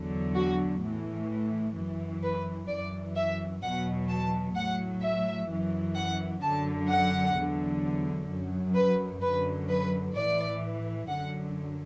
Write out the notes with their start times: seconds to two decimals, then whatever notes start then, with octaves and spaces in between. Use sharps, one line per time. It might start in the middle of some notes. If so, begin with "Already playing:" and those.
Already playing: E2 D3 F#3
0.35 F#4
0.81 A2
0.87 E3
1.76 F#2 E3
2.23 B4
2.68 F#2 E3 D5
3.16 E5
3.62 E2 B2 F#3 F#5
4.09 A5
4.55 A2 F#3 F#5
5.03 E5
5.49 F#2 E3
5.95 F#5
6.42 F#2 D3 F#3 A5
6.89 F#5
7.35 E2 D3 F#3
8.29 F#2 F#3
8.75 B4
9.22 F#2 D3 F#3 B4
9.69 B4
10.15 A2 E3 D5
11.08 F#2 D3 F#3 F#5